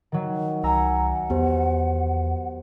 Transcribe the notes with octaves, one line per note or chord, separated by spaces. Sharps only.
D#3 F#3
C2 F#5 G#5 A#5 E6
E2 B3 G4 C5